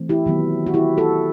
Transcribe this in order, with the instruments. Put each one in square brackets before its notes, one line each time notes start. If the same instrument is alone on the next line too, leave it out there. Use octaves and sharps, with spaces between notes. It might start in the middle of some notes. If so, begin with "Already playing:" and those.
Already playing: [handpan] E3 A3 C4
E4 G4
D#3 F#3 B3
F#4
E4 G4
F#4 A4